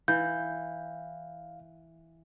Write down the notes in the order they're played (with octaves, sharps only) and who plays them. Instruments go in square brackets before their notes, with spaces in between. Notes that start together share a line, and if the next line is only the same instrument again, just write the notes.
[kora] E3 [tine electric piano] F5 [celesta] G6